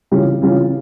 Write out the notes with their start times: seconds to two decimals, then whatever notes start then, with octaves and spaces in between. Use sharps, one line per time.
0.11 C#3 E3 G3 C#4 F4
0.42 C#3 E3 G3 C#4 F4